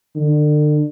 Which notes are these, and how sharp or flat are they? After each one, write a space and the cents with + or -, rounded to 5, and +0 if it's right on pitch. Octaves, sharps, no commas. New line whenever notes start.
D3 +35